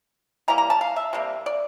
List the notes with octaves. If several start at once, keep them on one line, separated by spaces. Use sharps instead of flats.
E3 G3 A#3 A#5
A#5
A5
F5
E5
C3 G3 A#3
D5